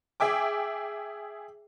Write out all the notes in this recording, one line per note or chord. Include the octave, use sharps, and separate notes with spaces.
G#4 E5 G5 D6